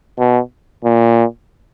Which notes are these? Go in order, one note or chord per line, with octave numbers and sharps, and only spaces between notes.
B2
A#2